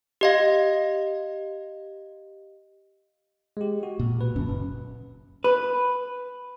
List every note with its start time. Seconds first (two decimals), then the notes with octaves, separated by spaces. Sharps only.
0.21 G4 D#5 F5
3.57 G#3 G4
3.83 F#4
3.99 A#2
4.16 B2 B4
4.36 D1 F#2 C#4
4.48 F#1
5.44 B4